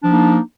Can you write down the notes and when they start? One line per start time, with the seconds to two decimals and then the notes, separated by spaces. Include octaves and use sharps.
0.02 D4
0.05 F3
0.07 D#4
0.10 A#3